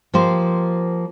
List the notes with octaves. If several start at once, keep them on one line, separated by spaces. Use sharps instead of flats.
F3 A#3 G4 C5